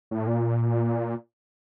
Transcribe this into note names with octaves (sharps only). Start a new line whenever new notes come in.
A2
A#2